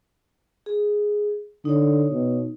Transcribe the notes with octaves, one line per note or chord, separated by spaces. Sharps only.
G#4
D3 D#4 C#5
B2